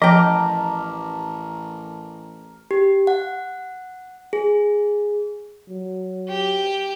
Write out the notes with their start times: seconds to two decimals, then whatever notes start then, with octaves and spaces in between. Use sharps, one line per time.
0.02 A1 F3 A#4 D#5 G5 A5 D6
2.71 G4
3.07 F#5
4.33 G#4
5.68 F#3
6.29 G4